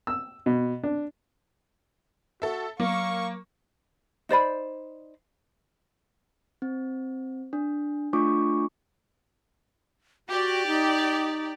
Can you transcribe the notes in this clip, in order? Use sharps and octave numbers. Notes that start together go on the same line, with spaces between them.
E6
B2
D4
F#4 A4 E5
F#3 A#3 F5 C#6
D#4 C5 D5 B5
C4
D4
A3 D4 F4 C#6 D6
F#4 G4 D5
D#4